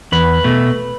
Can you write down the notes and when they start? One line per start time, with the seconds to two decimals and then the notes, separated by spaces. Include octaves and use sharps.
0.12 E2 B4
0.44 B2 A3